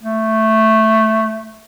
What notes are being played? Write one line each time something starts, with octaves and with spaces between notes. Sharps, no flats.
A3